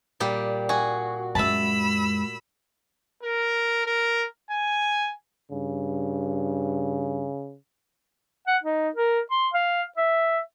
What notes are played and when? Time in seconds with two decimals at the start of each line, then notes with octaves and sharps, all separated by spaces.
0.20 A#2 G3 G4
0.69 F#4 G#4
1.35 F#2 G#3 E5 A5 B5 E6
3.23 A#4
3.86 A#4
4.51 G#5
5.52 G2 C#3
8.47 F#5
8.63 D#4
8.95 A#4
9.31 C6
9.54 F5
9.97 E5